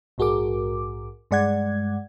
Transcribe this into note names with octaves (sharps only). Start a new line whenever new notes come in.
A#1 G#2 F#4 G#4 A#4 D6
G2 G#3 D5 F#5 G#6